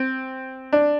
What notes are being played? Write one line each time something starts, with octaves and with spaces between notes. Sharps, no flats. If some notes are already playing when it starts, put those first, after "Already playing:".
Already playing: C4
D4